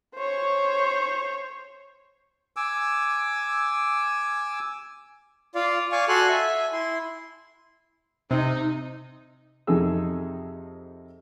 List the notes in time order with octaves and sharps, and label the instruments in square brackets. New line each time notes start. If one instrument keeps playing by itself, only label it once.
[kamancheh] C5 C#5
[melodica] G#5 D6 E6
[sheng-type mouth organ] F4 D5 F5
D5 F5 G#5 C#6
F#4 A4 G#5 C6 F#6
E5 G#5
E4 C6
[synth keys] C3 [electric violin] D#4
[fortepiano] F2 C3 D#4 G#4 A4 E6